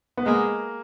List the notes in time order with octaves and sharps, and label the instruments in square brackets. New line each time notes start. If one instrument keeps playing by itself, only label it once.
[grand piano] B3
[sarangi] G#3 [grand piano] A#3